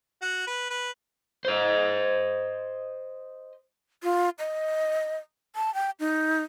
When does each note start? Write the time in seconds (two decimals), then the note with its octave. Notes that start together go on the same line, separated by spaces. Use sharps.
0.22 F#4 F#5
0.47 B4
0.70 B4
1.45 C5 D#5
4.03 F4
4.39 D#5
5.56 A5
5.74 G5
6.00 D#4